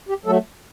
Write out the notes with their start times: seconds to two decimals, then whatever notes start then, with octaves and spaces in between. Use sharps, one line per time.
0.09 G4
0.25 F#3 A3 A4